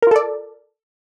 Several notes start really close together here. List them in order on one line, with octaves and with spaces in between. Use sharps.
A#4 F4 A4 D5